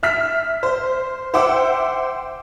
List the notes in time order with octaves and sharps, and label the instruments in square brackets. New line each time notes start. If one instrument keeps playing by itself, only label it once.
[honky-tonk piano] E5 F6 B6
C5
C5 E5 F#5 G5 D6 E6